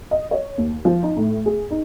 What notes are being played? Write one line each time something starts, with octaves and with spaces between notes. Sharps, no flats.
D#5
C#5
D#2
F3
D#4
A2
G#4
D#4